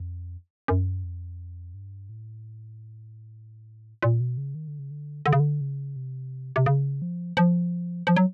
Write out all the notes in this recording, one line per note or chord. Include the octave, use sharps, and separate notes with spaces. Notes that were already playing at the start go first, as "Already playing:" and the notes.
Already playing: F2
F#2
F2
G2
A2
A#2
B2
C#3
D#3
D3
C#3
D3
D3
C#3
D3
C#3
C3
C3
C#3
F3
F3
F3
F#3